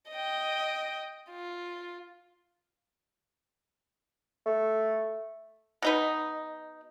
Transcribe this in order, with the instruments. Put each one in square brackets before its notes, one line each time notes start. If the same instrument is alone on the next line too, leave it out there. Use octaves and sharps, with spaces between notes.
[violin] D#5 G5
F4
[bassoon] A3
[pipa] B2 D#4 B4